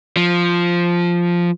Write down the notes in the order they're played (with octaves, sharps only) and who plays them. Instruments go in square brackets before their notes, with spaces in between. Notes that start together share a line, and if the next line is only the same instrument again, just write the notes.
[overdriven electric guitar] F3